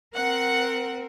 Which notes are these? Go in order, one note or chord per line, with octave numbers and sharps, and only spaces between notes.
C4 A#4 F#5